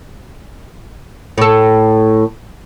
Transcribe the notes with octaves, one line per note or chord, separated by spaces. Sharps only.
A2 A4